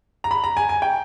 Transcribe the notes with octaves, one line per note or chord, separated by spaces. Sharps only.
A#5
B5
A#5
G#5
G#5
G5